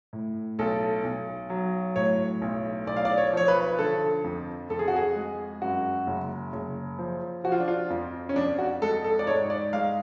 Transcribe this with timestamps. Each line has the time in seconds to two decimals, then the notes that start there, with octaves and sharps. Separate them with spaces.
0.13 A2
0.59 B1 A4
1.04 B1
1.50 F#3
1.96 A2 C#5
2.42 B1
2.87 B1 D5
2.96 F5
3.05 D5
3.18 C#5
3.33 F3 C#5
3.48 B4
3.79 D3 A4
4.24 F2
4.70 F2 A4
4.79 G#4
4.88 F#4
4.96 G#4
5.16 G#3
5.62 F#2 F#4
6.07 F#1
6.53 F#1
6.99 F3
7.44 F3 F#4
7.52 F4
7.60 D4
7.68 F4
7.90 F2
8.29 C#4
8.36 F2 D4
8.59 F#4
8.82 G#3 A4
9.04 A4
9.19 D5
9.27 G#2 C#5
9.50 D5
9.73 G#3 F5